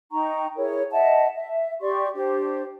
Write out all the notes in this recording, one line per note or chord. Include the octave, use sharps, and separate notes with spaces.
D#4 G5 A#5 C#6
E4 G#4 A#4 C#5
D#5 E5 F#5 A5
E5
G4 D5 C6 C#6
D4 G4 C5